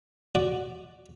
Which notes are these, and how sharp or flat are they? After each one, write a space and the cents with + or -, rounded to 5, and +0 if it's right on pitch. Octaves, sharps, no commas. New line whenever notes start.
F#4 +0 D5 +0